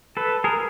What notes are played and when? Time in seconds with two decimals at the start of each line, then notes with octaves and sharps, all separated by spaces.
0.17 A4 B4
0.44 G#4 A#4